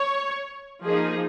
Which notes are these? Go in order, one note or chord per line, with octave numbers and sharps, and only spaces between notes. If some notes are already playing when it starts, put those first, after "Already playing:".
Already playing: C#5
F3 A#3 D#4 G#4